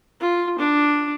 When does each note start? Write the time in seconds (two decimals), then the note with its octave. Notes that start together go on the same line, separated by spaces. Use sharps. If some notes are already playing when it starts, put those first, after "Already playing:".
0.21 F4
0.59 D4